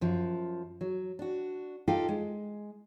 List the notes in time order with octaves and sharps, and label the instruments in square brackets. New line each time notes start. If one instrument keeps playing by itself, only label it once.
[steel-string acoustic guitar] F#2 F3
F#3
D4 F#4
D#4 F4 G4 A4 F5
G#3